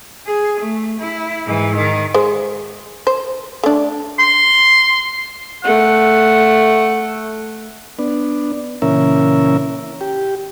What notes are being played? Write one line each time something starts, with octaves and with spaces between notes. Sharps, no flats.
G#4
A3
E4
G#2 E3
D#3
G#3 C5
C5
A3 D4
C6
A3 F#5
B3 D4
A#2 C#3 E3 C#4 A#4 E5
G4